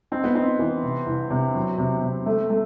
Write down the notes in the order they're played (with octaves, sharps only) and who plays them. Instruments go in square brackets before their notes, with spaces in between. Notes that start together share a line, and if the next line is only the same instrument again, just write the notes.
[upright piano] C4 [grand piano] D#4
[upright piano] B3
[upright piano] C4 [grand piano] D#4
[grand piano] E3
C3
C2
C3
F#3
C3
C3
A3
A3